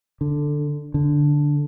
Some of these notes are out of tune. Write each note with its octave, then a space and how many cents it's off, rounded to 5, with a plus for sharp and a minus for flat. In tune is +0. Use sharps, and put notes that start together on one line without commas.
D3 +5
D3 -5